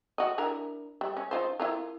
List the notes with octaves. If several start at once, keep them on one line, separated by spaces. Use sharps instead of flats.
F#4 D#5
D4 E4 A#4
G3
C#4
D#4 F4 C5
E4 F4 A#4